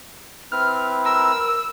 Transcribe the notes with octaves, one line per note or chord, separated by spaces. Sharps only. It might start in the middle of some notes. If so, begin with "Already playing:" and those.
C4 E4 B4 F6
A#4 E6